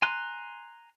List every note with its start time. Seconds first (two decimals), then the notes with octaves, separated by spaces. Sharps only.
0.02 G#5 A#5 C6 F#6